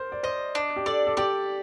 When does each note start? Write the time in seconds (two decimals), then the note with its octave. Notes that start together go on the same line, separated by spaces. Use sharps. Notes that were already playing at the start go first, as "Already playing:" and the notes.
Already playing: A#4 C5
0.12 D5
0.23 C5 D#5
0.55 D4
0.76 G4
0.86 A4 D5
1.07 A4
1.17 G4 D5